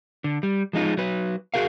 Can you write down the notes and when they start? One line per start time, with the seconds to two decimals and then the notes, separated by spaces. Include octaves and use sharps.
0.24 D3
0.43 G3
0.73 F3 G#3 D#4 F4
0.97 F#3 B4
1.54 F#4 G#4 A#4 F5